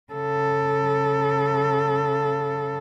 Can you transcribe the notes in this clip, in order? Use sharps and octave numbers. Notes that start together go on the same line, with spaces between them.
C#3 A4